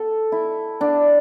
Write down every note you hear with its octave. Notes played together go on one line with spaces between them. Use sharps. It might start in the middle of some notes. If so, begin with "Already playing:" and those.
Already playing: A4
E4
D4